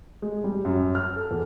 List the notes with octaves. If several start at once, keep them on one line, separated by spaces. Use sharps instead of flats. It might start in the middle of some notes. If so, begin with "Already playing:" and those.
G#3
G3
F#2
F6
A4
E2